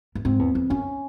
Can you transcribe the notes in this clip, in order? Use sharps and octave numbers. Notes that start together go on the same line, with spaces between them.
G2
G#2 C4
E2
F2
F#2 C#4